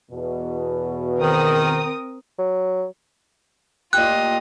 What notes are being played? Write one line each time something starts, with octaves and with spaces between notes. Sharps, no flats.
E2 B2
D#3 C4 A#4 D#6
F#3
A#2 F4 G4 D#5 F#6